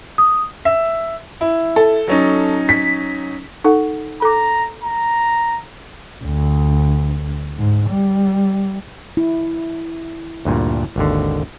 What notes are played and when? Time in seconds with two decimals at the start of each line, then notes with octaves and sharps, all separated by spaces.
0.18 D#6
0.65 E5
1.41 E4
1.76 A4
2.08 F#3 C#4 D#4
2.69 B6
3.64 D#4 A4 F#5
4.22 A4 A#5 D6
4.84 A#5
6.24 D2
7.58 G#2
7.89 G3
9.17 E4
10.45 D2 G2 A#2
10.96 G#1 D#2 D3